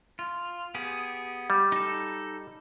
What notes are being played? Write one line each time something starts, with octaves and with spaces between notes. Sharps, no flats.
F4
B3 G4 G#4
G3
D#4 A4